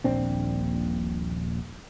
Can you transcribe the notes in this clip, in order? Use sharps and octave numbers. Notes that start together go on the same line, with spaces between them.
D#1 A#1 C4 D4